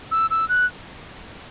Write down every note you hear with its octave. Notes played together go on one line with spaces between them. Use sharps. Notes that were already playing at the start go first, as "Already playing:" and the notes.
E6
E6
F#6